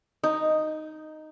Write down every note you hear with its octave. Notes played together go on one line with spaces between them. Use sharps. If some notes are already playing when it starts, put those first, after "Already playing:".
D#4